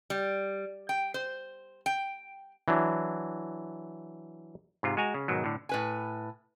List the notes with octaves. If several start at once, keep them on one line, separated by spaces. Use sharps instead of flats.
G3
G5
C5
G5
E3 F#3 D4
G#2 C3 F4
G#3 F#4 G#5 A#5
C#3
G#2 B2 D#3 F#3
A2 D3
A2 B4 G#5